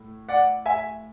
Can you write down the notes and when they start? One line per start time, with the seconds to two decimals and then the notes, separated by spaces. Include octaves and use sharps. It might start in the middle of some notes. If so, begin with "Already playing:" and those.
Already playing: A2
0.29 D5 F#5
0.66 E5 G#5